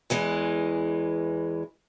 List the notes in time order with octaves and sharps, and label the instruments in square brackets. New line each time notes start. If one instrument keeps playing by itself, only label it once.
[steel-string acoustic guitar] E2 E3 G#3